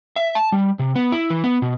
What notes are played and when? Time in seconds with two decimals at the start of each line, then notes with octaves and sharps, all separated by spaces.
0.16 E5
0.35 A5
0.52 G3
0.79 C3
0.95 B3
1.12 E4
1.30 E3
1.44 B3
1.62 B2